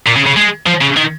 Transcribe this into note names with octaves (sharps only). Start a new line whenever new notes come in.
A#2
C#3
C#3
G#3
F3
C#3
D#3